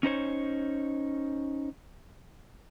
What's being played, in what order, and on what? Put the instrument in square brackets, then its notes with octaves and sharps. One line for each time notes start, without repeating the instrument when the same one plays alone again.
[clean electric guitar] C#4 D#4 C5 C#5